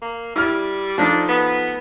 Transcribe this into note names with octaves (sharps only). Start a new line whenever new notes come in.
A#3
G3 E4 F6
F3 A3 D4 D#4
B3